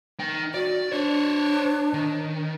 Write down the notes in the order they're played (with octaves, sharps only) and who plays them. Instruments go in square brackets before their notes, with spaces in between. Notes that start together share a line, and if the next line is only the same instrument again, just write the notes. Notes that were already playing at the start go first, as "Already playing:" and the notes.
[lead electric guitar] D#4 G5
[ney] F#4 [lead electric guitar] D5
[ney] D4 [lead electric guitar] C5 C#5
[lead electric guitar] D#3